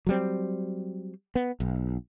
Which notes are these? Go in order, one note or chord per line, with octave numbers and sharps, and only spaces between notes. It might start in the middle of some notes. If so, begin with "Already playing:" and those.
F#3 G3 C4
B3
B1